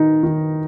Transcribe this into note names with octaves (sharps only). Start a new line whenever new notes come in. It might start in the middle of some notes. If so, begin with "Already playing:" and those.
Already playing: D#3 D#4
D#3